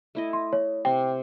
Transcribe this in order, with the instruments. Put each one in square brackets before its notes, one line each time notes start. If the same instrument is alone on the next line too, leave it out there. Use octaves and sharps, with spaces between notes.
[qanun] A3 E4 D#5
[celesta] C6
C#5
[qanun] C3 [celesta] G5